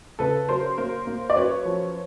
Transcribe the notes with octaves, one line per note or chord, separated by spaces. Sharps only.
C#3 A4 B4
F#3 A#4 C5
A#3 A#4 C5
A#3
D5
F#2 B4 C#5
F3